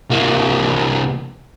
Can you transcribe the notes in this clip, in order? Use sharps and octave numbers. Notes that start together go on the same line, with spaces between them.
C2 A#3